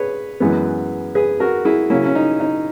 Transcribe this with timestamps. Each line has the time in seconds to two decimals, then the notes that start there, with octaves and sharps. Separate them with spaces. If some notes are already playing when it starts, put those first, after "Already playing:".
Already playing: G#4 B4 C#5
0.40 F#2 E3 G#3 B3
1.15 G#4 B4
1.40 F#4 A#4
1.65 E4 G#4
1.90 C#3 F#3 A#3 C#4 E4
2.06 C#4
2.15 D#4
2.40 D#4